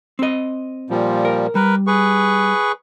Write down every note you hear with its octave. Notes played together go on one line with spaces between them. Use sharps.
C4 D#5
A#2 F3 G3
A#4
G3 A#4 B4
G#4 B4 C#6